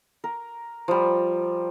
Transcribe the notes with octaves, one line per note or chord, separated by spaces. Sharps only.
A#4
F3 G3